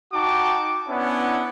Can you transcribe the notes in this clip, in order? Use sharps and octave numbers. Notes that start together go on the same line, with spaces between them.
D#4 F#4 G5 A5 D6
B3 C#4 D4 E4